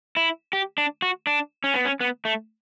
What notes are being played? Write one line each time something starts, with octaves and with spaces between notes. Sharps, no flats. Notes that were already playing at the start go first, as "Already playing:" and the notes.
E4
G4
D4
F#4
D4
C#4
B3
C#4
B3
A3